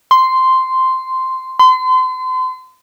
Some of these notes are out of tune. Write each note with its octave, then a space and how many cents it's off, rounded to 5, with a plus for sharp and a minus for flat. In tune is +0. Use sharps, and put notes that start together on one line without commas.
C6 -5
C6 -35